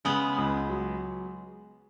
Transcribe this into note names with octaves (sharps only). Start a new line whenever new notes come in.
C#3 G#3 B3
C#2
F#3